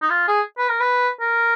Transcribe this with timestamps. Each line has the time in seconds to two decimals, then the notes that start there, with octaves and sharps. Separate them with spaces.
0.02 D#4
0.10 F4
0.28 G#4
0.58 B4
0.68 A#4
0.80 B4
1.21 A#4